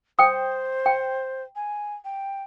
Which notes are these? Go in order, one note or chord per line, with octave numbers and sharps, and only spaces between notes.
C5 G5 D#6
G5
G#5
G5